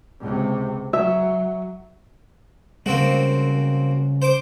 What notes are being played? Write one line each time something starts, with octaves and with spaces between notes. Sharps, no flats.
C#2 C3
F#3 E5
C#3 G3 G#3 A#3 C4 F#4
C5 D6